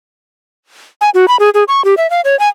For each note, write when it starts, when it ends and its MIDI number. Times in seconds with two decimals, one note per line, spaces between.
1.01 1.10 80
1.14 1.28 66
1.28 1.37 83
1.40 1.50 68
1.54 1.64 68
1.68 1.84 85
1.85 1.95 67
1.97 2.09 76
2.10 2.21 77
2.25 2.38 73
2.39 2.48 80